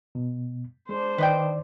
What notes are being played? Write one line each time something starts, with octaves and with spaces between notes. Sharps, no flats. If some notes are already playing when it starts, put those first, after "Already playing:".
B2
G#3 D4 C5
D#3 B4 D5 D#5 G5